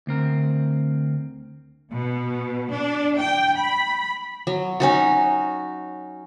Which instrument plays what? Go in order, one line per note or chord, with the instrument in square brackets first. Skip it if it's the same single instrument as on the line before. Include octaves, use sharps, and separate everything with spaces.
[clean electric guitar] D2 C4 A#4
[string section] B2
D4
G5
B5
[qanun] F#3
C#4 D#4 F#4